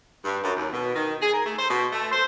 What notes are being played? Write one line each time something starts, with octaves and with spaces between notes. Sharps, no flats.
G2
F#2
D#2
B2
D#3
G#4
A#4
A3
C5
B2
A3
C5